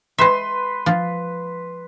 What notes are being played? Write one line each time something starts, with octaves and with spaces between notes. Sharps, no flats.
G#3 B4 E5 C6
F3